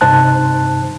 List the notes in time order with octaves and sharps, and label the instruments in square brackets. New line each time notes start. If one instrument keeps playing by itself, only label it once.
[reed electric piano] G2 C3 D#4 C5 A5 F#6